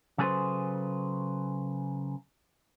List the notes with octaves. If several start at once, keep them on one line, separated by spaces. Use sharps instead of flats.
C#3 F#3 G#4 A4 B4 C5